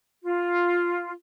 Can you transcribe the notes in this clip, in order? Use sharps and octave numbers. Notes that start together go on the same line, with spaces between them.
F4